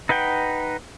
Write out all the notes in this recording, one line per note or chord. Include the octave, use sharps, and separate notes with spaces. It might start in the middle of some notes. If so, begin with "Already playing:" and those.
D#4 B4 F#5 G5